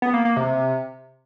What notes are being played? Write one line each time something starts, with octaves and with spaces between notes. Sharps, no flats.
B3
A#3
A#3
C3